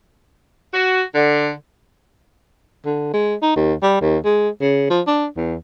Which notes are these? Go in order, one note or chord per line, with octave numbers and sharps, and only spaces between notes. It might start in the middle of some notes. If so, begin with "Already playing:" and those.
F#4
D3
D3
G#3
D#4
D#2
G3
D#2
G#3
C#3
F3
D4
E2